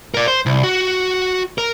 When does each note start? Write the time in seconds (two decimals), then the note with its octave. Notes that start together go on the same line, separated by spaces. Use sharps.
0.14 A#4 D5
0.28 C5
0.46 C2
0.64 F#4
1.58 A#4